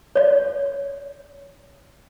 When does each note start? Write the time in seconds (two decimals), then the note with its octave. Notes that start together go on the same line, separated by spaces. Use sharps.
0.15 C#5 D5